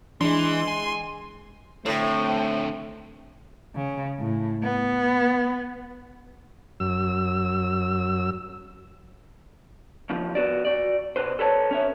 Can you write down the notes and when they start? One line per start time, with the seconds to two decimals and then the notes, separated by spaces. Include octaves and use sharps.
0.21 E3 G#3 D4 C6
0.68 G#5
1.86 A2 D3 A3 C4 C5 G5
3.75 C#3
4.20 A2
4.63 B3
6.80 F#2 E6
10.10 D#2 C#3 F3
10.35 B3 F#4 D5
10.65 F#4 D5
11.16 B2 B4 C5
11.39 A4 B4 C#5 A5
11.71 C#4 C#5 E5